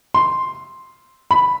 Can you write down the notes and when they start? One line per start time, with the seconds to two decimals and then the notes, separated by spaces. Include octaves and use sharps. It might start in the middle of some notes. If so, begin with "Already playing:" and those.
0.14 C6
1.31 B5